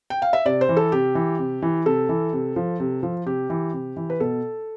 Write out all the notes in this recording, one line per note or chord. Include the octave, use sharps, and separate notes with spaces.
G5
F5
E5
C3 D5
C5
E3
A4
C3 G4
E3
C3
E3
C3 A4
E3
C3
F3
C3
F3
C3 G4
E3
C3
E3
B4
B2 A4